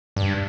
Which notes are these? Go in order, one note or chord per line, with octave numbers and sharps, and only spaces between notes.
G2